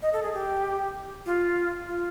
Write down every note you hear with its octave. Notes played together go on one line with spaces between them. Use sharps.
D#5
A4
G#4
G4
F4
F4